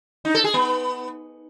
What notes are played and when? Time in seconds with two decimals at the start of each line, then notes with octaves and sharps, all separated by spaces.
0.25 D#4
0.35 A4
0.44 G#4
0.54 B3